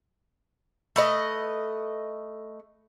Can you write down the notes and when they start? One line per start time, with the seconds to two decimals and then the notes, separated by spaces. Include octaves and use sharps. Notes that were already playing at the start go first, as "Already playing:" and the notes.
0.96 A3 B4 D#5